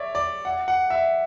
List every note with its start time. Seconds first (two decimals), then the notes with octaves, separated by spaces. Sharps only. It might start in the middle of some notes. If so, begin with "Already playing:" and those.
Already playing: C#5 D5 E5
0.15 D5
0.45 F#5
0.68 F#5
0.90 E5